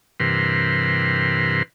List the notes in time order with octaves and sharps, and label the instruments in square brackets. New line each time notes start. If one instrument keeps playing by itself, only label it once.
[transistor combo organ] G2 C3 E3 A#4 B4 C6